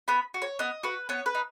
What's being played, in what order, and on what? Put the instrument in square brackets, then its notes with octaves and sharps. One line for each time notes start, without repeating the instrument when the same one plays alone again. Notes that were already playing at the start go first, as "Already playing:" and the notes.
[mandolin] B3 B5
F#4
C#5
B3 D#5
F#4 B4
B3 C#5
B4
D#4